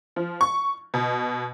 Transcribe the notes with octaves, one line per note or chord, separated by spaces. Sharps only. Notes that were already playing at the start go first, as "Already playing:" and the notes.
F3
C#6
B2